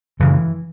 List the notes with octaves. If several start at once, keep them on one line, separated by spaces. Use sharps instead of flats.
F#2 C#3 E3